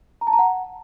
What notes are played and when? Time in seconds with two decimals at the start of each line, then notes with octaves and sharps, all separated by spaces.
0.21 A#5
0.27 A5
0.33 A#5
0.39 F#5